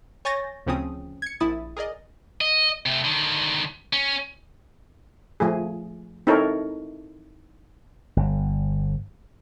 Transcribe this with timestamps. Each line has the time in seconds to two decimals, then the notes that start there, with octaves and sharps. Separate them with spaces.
0.25 C#5 G#5 C#6 G6 A6 A#6
0.66 D2 C#3 F3 C4 C#4 D#6
1.22 G#6 C#7
1.40 A#1 E4 D#6 A6
1.77 G#4 A#4 D5 D#5
2.41 D#5
2.86 C3 A3
3.04 D3 D#3
3.93 C#4
5.40 F3 A3 G#4
6.27 C4 D#4 E4 A4 A#4 C#5
8.17 G1